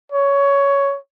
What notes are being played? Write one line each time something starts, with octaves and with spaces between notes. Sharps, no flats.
C#5